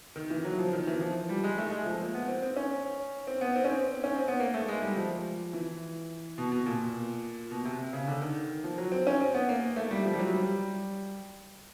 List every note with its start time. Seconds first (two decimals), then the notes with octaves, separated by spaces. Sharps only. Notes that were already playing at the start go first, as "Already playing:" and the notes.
0.16 D#3
0.30 E3
0.45 F#3
0.58 F3
0.73 D#3
0.87 E3
1.01 F3
1.29 G3
1.44 G#3
1.58 A3
1.71 G#3
1.86 F3
2.00 A#3
2.14 B3
2.28 C4
2.42 C4
2.56 C#4
3.27 C4
3.41 B3
3.56 C4
3.64 C#4
3.69 C4
4.04 C#4
4.16 C4
4.28 B3
4.40 A#3
4.54 A3
4.68 G#3
4.82 G3
4.96 F3
5.53 E3
6.38 B2
6.52 B2
6.66 A#2
7.51 B2
7.65 C3
7.93 C#3
8.08 D3
8.22 D#3
8.64 F3
8.78 F#3
8.92 C4
9.07 C#4
9.20 C4
9.34 B3
9.49 A#3
9.76 A3
9.91 G3
10.05 F3
10.14 G3
10.19 F#3
10.33 G3